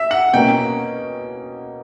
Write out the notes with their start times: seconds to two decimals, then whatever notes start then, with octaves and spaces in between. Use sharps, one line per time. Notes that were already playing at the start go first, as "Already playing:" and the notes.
Already playing: E5
0.11 F#5
0.34 B2 A#3 C#4 G5